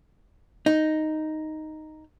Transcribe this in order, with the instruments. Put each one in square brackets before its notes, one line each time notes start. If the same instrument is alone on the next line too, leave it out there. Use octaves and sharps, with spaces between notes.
[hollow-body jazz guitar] D#4